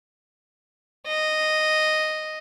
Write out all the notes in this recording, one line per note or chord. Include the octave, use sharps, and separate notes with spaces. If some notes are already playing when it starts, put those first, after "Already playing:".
D#5